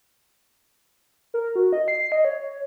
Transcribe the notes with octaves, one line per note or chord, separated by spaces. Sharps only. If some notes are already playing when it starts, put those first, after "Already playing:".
A#4
F#4
D#5
C7
D#5
C#5